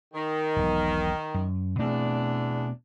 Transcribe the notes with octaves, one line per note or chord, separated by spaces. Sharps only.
D#3
E1 B1
F#2
E2 B2 A3 C4 D4